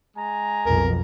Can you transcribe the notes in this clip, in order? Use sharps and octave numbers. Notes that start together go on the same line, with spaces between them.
G#3 G#5 A#5
B1 F2 A#4